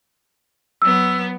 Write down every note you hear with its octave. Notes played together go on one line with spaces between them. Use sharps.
F#3 B3 E6